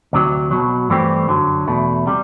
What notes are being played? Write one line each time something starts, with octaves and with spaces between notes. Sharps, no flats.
D2 C3 F#3
B1 B2 F#3
G2 E3 A3 C4 G4
F#2 D3 F#3
E2 B2 A3
C3 G3